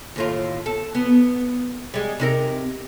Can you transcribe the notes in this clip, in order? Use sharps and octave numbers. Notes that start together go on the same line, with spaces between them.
D#2 A2 F4
A4
B3
G3 G#3
C3 D#4 A#4